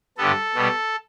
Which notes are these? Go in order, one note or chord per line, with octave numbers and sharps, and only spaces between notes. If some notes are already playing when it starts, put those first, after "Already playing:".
G2 D3 G3 B3 A4
B2 G3 B3